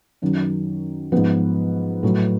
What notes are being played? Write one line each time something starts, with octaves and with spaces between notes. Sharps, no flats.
F#2 D#3 F#3
G#2 F3 B3 B4
A2 F#3